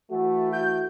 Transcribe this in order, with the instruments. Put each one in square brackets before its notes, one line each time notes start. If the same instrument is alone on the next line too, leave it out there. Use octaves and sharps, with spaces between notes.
[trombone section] E3 A3 [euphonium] F#4
[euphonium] F#4 [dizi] G6